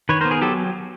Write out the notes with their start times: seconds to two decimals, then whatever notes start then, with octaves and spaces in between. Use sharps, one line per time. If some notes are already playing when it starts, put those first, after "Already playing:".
0.09 D#3 B4 C#5
0.21 B3 A#4 C5
0.31 G#4 A#4
0.41 F#3 G4 A4